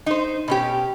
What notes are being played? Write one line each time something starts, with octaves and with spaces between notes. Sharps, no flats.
D#4 C5
B2 C#4 G4